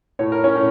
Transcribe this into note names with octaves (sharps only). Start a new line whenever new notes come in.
A2 C#5
A#4
C#4 C#5
A2